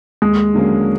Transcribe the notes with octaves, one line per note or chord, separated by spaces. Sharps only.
D#2 G#3
D3 F#3 A#3 C#4